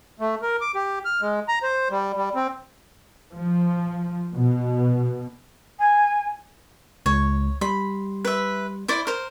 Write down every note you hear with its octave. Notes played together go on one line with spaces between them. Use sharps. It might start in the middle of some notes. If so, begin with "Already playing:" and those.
A3
A#4
D6
G4
F6
G#3
A#5
C5
G3
G3
C4
F3
B2
G#5
C#2 C#5
G3 B5 C6
B4 E5
E4 C5 D5
A#4 C5